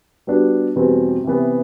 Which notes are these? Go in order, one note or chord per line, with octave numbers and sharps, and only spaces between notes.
G3 B3 D4 F#4
E2 B2 G3 C4
C3 E3 B3